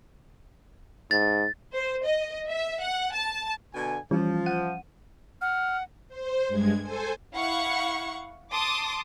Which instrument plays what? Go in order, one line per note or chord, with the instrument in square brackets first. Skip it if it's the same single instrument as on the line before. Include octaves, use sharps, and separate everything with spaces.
[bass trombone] G#2 [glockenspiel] A6
[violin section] C5
D#5
E5
F#5
A5
[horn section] B2 D3 G#5
[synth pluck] E3 G3 C#4 [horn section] F3
[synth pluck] F#5 D#7
[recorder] F#5 [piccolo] F6
[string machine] C5
G2 G#3 G#6
A4 C5 G#5
[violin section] E4 F5 F#5 C#6 C#7
A5 C6 D6 D#6